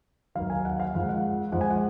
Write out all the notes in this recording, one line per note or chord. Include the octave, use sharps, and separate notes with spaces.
D#2 D#3 F#3 F5
G#5
F#5
F5
F2 F3 G#3 F#5
F#5
F2 F3 G#3 F#5
G#5
F#5